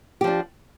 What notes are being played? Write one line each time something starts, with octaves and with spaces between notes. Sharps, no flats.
F3 D4 G4